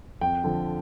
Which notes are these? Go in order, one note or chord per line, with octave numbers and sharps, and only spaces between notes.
F2 G5
D3 F3